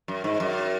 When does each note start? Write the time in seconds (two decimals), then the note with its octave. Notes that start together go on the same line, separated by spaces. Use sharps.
0.08 F#2
0.24 G#2
0.40 F#2